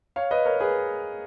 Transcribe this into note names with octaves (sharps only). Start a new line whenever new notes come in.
C#5 F5
B4 D#5
A#4 C#5
G#4 B4